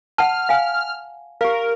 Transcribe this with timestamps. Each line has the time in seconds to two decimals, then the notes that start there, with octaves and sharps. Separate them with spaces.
0.18 F#5 A5 F6
0.49 F5 G#5
1.41 G4 A#4 F5